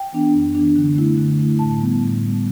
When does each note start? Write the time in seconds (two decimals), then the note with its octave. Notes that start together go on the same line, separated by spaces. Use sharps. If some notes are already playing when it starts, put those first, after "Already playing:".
Already playing: G5
0.13 E3 B3 D4
0.34 F#2
0.55 E3 B3 D4
0.75 D3
0.96 A3 E4
1.18 D3
1.39 A3 E4
1.59 A2 A5
1.81 G3 B3
2.02 A2
2.23 G3 B3